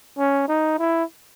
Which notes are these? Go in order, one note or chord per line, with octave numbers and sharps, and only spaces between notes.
C#4
D#4
E4